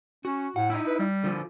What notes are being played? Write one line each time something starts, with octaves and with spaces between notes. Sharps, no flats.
C#4 F#4
A2 F#5
D#4 E4
B4
G3
D3 F3